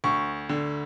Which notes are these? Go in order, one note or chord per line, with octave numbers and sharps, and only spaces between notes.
D2 C#6
D3